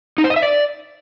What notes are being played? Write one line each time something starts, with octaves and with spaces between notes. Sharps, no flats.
D#4
C5
D#5
E5
D5